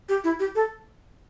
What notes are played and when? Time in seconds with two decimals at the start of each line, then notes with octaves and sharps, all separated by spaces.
0.09 G4
0.24 E4
0.40 G4
0.55 A4